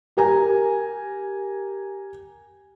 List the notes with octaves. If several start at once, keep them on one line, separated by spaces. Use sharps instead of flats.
G4 A#4 G#5 A#5